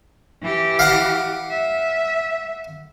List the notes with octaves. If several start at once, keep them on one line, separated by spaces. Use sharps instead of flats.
E3 G4
F5 F#5
E5